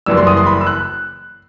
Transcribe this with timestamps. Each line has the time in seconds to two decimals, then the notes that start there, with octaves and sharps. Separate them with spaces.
0.06 F#1 F#2 E3 G3 E6
0.17 C6
0.27 D#6
0.37 C6
0.46 B5
0.61 E6
0.67 F#6